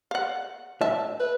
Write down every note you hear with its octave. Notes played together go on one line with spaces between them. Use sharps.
F5 F#5
E5 A5
B4